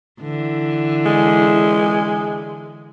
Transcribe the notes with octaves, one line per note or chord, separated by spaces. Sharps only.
D3 E3
G#3